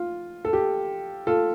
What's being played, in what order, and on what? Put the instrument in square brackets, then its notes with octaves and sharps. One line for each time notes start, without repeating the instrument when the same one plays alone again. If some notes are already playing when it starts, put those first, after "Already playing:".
Already playing: [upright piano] F4
A4
G4
F4 A4